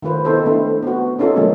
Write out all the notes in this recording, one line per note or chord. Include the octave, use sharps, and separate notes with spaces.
D#3 A3 F4 B4 C5
B3 C4 D#4 E4 A4 C5
A3 C4 D4
B3 F#4
A3 C#4 D#4 F4 G#4 A4
D3 F3 G#3 A#3 C#4 F4